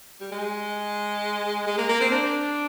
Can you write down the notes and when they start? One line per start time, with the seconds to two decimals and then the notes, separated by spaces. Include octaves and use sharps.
0.21 G3
0.32 G#3
1.67 G#3
1.78 A#3
1.89 A#3
2.01 C4
2.12 D4